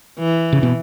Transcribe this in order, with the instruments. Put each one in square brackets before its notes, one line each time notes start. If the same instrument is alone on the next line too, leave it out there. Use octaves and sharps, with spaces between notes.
[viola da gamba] E3
[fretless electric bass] C#3
B2